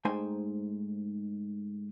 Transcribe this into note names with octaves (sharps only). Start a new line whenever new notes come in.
G#2 A3 D#4 C5 G5 G#5